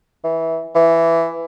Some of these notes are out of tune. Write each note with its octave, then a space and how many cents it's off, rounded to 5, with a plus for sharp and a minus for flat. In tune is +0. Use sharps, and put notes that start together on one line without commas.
E3 -15
E3 +10